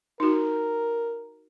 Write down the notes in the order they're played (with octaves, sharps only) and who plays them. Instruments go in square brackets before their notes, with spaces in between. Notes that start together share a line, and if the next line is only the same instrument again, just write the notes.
[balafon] D#4 F#4 [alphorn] A#4